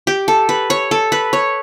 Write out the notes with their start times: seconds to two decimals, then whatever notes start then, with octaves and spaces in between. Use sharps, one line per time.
0.07 G4
0.28 A4
0.49 B4
0.70 C#5
0.91 A4
1.12 B4
1.33 C#5